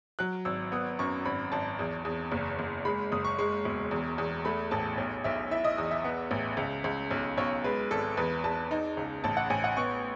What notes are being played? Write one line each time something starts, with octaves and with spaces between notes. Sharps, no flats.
F#3 F#6
G#1 E6
B3 D#6
F#2 C#6
G#1 B5
G#1 A5
E2
E2
F#1
F#1
G#3 B5
F#1 D#6
C#6
G#3 C#6
E1
E2
E2
A3 B5
A1 A5
B1
B1 E5
E4 E5
D#5
E2
E5
B3
A1
C#2
C#2
B1
B1 C#5
G#3 B4
G#1 A4
E2 B4
E2 A5
D#4
C#2
A1 A5
F#5
A1 G#5
F#5
B3 C#6